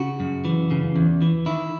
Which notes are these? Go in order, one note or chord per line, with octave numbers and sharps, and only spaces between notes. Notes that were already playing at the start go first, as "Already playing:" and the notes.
Already playing: C#3 F#4
F#2
E3
C#3
E2
E3
D#3 E4